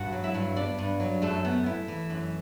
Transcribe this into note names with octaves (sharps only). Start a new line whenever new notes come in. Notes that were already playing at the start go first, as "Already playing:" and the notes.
Already playing: G2 F#4 F#5
F#3
E4 E5
G2
B3 D4 D5
G2
F#3
F#2 A3 A4
B3
E4
E3
F#2